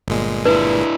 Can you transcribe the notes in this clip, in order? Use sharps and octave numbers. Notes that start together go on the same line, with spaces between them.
G1 A#2 G#3
D4 E4 B4